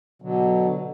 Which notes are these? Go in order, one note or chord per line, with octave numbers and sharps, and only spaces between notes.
B2 D3 F#3